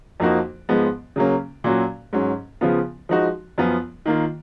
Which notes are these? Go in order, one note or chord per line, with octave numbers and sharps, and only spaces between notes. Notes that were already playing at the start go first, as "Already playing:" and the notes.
F2 F3 A#3 D#4 F#4
G#2 F3 G#3 B3
C#3 F#3 A#3 C#4
A#2 F#3 C#4 F#4
G#2 F#3 C#4
C#3 F3 B3 F4
F3 G#3 D#4 F#4
F#2 F3 B3 F4
D#3 A#3 F4